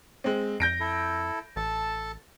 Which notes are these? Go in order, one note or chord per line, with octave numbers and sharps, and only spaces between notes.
G#3 C4
F2 G6 A#6 D7
E4 A4
A1 A4 A5